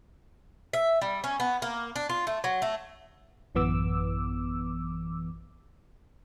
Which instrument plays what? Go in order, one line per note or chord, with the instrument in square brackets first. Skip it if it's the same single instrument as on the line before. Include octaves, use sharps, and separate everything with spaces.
[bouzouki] E5
G3
C#4
B3
A#3
D4
F4
A3
F#3
A3
[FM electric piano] A1 F#2 E3 B3 D6 E6